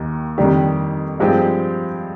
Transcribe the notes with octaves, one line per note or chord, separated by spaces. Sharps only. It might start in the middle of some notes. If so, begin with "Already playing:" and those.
Already playing: D#2 D#3
F2 D#3 G3 D4 G4
G2 F3 G#3 C4 G4